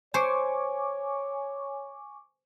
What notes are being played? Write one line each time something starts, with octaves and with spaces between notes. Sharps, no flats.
C5 C#5 G#5 C#6 D6